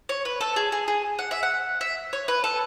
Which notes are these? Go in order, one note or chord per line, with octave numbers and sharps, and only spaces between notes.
C#5
B4
A4
G#4
G#4
G#4
F#5
E5
F#5
E5
C#5
B4
A4